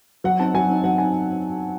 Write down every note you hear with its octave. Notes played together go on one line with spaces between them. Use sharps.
F#3 F#5
C4 D#4 A5
F#3 G#5
C4 D#4
F#3 F#5
C4 D#4 G#5